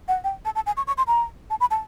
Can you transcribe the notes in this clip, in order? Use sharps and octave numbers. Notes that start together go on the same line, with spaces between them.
F#5
G5
A5
A5
G#5
C#6
C#6
C6
A#5
A5
B5
A5